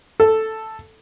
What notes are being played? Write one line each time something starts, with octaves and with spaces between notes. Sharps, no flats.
A4